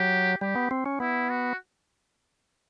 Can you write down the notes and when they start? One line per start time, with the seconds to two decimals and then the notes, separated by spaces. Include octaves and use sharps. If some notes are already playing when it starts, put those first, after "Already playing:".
Already playing: F#3 G4
0.41 G3 G4
0.56 B3
0.71 C4
0.86 C#4
1.00 B3 E4
1.30 F#4